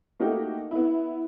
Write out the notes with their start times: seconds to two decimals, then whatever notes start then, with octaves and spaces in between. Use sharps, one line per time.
0.20 A3 A#3 D#4 F#4 G4
0.71 B3 E4